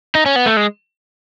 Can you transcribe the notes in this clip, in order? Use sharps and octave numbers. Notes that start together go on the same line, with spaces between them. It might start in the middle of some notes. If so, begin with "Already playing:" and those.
D#4
C#4
B3
A3
G#3